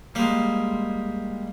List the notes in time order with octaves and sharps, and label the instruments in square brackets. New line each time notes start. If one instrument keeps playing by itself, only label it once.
[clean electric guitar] G3 G#3 [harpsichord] A#3